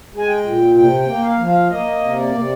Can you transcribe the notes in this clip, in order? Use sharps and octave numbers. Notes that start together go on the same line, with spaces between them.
G#3
G#5
G5
A#2
C3 G5
G5
A#3
F5
F3
F5
A#3 D#5
C3
D5
C3